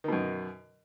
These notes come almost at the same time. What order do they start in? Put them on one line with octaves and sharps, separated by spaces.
D#3 B2 F#2